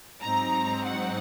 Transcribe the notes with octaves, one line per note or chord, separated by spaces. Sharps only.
G#2 F#3 C4 D#4 A#5
F#5